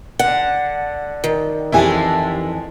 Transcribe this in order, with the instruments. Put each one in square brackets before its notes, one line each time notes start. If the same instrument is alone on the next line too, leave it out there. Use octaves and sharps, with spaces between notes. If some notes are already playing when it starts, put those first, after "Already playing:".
[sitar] D3 [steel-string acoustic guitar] F#5
[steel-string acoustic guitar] D#3
[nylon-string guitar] F2 E3 G#5 [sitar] F3 G#3 A3 [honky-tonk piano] E4 G4